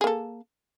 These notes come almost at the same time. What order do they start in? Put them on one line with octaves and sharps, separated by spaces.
G#4 A#3 A4